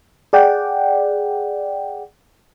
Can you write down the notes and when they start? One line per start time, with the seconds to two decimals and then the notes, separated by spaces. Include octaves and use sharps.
0.33 G#4 D5 F#5 G5